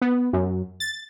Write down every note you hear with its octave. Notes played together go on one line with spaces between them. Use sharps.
B3
F#2
A6